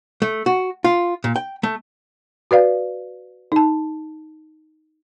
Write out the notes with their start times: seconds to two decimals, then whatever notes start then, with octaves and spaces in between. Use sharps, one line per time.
0.22 A3
0.46 F#4
0.84 F4
1.24 A#2
1.36 G5
1.63 A3
2.51 F#4 B4 D5 F5
3.52 D#4 A5